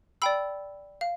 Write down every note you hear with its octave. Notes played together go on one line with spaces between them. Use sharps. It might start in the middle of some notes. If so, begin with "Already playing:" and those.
D5 G5 B5 E6
F5